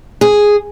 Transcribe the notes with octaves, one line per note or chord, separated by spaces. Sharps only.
G#4